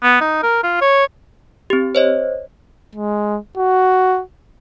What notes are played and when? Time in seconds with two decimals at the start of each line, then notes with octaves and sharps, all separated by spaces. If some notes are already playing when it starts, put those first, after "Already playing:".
0.03 B3
0.21 D#4
0.43 A#4
0.63 F4
0.81 C#5
1.70 C4 G4
1.95 C5 C#5 D#5
2.96 G#3
3.57 F#4